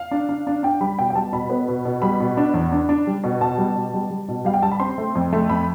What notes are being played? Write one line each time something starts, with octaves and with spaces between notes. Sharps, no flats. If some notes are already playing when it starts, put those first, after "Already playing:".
Already playing: F5
D4
D4
D4
D4 G5
G3 B5
B2 G5
G5
G3 A5
B2 B5
B3
B2
B2
G3 B5
B2
D4
E2
D4
D4
G3
B2
B2 A5
G3
B2
G3
G3
B2
G3 F5
G5
G3 A5
B5
C4 C6
A3
F2
A3
F2 B5